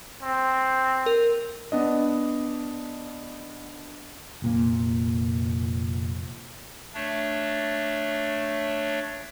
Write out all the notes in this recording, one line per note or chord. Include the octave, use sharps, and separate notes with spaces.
C4
A#4
B3 D4 D#5
F1 A#2 A#3
A3 D4 C#5